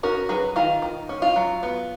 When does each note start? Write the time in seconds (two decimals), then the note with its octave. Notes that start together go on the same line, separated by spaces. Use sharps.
0.03 C#4 F#4 A#4
0.29 F#3 G#4 B4
0.56 D#3 F4
0.82 D#3
1.09 C#4
1.22 F4
1.36 F#3
1.63 B3